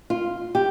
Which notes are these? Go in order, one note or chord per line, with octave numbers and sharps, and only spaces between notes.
F4
G4